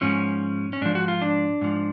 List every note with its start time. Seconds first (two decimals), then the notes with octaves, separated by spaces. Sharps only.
0.01 G#2 F3 C#4
0.73 C#4
0.81 G#2 F3 D4
0.95 F#4
1.08 F4
1.22 D4
1.61 G#2 F3